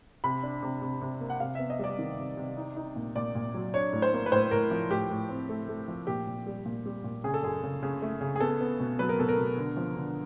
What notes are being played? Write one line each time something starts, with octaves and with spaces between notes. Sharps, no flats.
C3 B5
D4
C3
C3
C3
A#3
F#5
C3 F5
B3 E5
D#5
G3 D5
D#3
C3
C3
D#4
D#4
A#2
A#2 D5
A#2
F#3
D4 C#5
A2
C5
A#3
B4
A2 C5
A2 A#4
F3
A2 G4
A2
C4
A3
A3
F3
A#2 G4
A#2
G3
A#2
G3
A#2
C#3 G#4
A4
F#2 G#4
C#3
C#3
A3
C#3
G#4
B3 A4
B3
B2
F#3 B4
A#4
B2 A4
A#4
B2
D3
F3
D3